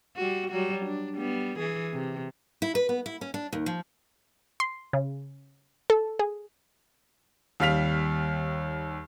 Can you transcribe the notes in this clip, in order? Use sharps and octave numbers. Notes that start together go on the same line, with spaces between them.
G3 F#4
F#3 G3 F#4
D4
G3 B3
E3 G#4
C3
E4
B4
B3
E4
C#4
D4
D#2
F3
C6
C#3
A4
G#4
D#2 G3 F5 F6 B6 F7